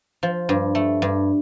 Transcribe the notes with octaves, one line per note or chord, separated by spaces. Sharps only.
F3
G2
A3
G2